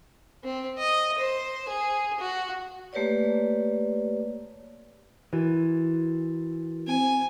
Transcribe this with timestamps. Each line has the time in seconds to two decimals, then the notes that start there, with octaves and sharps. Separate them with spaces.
0.44 C4
0.78 D#5
1.18 C5
1.68 G#4
2.20 F#4
2.93 A3 A#3 G4 B4 C#5 D5
5.33 E3 F#4 A#4 A6
6.87 C4 G#5